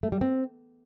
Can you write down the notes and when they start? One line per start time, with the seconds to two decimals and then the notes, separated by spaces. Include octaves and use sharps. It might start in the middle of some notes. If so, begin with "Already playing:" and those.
0.03 A3
0.12 G3
0.21 C4